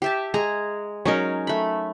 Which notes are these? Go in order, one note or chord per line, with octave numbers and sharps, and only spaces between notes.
G4 E5 A5
G#3 G#4 A#5
F#3 C#4 D#4 A#4
A3 B5